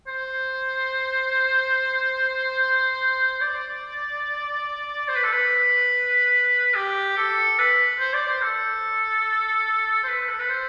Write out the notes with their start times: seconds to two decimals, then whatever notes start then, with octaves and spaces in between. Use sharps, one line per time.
0.07 C5
3.41 D5
5.08 C5
5.15 B4
5.23 A4
5.32 B4
6.75 G4
7.17 A4
7.59 B4
7.99 C5
8.13 D5
8.27 C5
8.42 A4
10.03 C5
10.08 B4
10.29 A4
10.39 B4
10.50 C5